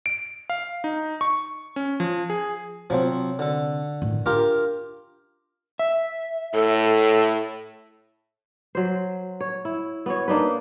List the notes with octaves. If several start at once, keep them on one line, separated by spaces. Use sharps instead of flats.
D7
F5
D#4
C#6
C#4
F3
G#4
C3 F3 F#3 C4
D3 A4
A2 D#3
D4 F4 G4 A#4
E5
A2 A4
F#3 C5
C#5
E4
B3 F#4 C#5
A#3 D4 D#4 B4